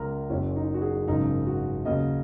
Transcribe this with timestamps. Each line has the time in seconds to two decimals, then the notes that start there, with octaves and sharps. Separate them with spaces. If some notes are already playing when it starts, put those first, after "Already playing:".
Already playing: C#2 C#3 A#4
0.30 F#1 F#2 F#3 C#4
0.56 D#4
0.74 F#4
0.82 G#4
1.07 G#1 F#2 C#3 D#4
1.46 F#4
1.85 D#2 C#3 F#3 D#5